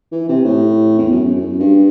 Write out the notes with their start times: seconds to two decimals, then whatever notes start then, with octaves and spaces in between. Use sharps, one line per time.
0.12 E3
0.29 C3
0.45 A2
0.98 E2
1.11 F#2
1.35 F#2
1.59 G2